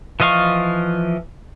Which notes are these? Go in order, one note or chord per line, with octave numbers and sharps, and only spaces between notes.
E3 F3 D#5 F5 C#6